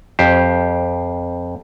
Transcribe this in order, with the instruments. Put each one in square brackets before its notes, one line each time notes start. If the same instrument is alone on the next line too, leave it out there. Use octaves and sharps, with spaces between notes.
[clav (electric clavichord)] F2 G4 C5